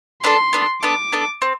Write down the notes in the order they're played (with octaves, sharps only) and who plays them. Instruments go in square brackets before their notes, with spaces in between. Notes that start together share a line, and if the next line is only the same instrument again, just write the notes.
[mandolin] B3 D4 A4 [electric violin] C6
[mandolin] B3 D4 A4
[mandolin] B3 D4 A4 [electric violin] D6
[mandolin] B3 D4 A4
C4